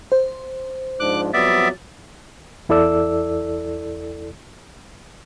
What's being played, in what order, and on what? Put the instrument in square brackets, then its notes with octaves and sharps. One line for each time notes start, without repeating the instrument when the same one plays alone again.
[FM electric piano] C5
[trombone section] G#2 F3 D4 [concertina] D6 F#6
[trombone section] F2 F#3 G3 [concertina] B3 D5 E5 [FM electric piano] A6
[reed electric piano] E2 E4 A4 D5 E6